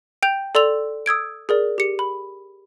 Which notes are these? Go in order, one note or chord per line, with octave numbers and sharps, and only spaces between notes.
G5 G6 F7
A4 D5 C6 E6 F7
D#6 E6 G#6 D7
G#4 A#4 D5
G4 C#7
B5